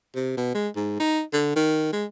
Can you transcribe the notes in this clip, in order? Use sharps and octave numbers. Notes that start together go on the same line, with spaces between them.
C3
B2
G#3
G#2
D#4
D3
D#3
G#3